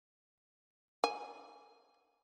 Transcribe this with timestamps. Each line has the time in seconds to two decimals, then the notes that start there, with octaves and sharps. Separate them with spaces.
1.04 G#5